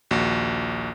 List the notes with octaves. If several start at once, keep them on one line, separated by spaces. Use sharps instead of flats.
A#1 D#2 F#4